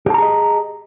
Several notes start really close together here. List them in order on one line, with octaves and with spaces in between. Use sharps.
G4 A5 A#5 G#4 D#5